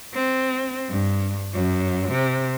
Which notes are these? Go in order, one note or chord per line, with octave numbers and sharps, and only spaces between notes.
C4
G2
F#2
C3